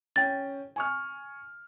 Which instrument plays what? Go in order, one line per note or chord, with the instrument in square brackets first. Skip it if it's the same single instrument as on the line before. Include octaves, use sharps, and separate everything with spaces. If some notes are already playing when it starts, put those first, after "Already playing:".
[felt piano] C#4 G5 [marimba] A6
[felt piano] G#5 C#6 F6